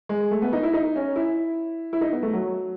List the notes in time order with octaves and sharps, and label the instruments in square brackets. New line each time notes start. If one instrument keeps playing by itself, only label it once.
[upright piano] G#3
A3
B3
D#4
E4
D#4
C#4
E4
E4
D#4
B3
A3
F#3